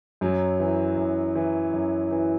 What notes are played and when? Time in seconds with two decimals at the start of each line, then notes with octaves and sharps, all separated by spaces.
0.21 F#2 F#3
0.60 E3
0.98 F#2
1.35 E3
1.74 F#2
2.11 E3